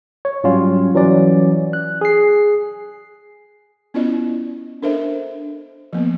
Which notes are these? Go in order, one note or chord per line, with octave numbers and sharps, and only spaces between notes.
C#5
G#2 F#3 G3 C#4 F4
E3 F#3 C#4 D5
F#6
G#4 C7
B3 C#4 E4 F4 D5 D#5
D4 A4 A#4 C5 D#5 E5
F3 A#3 B3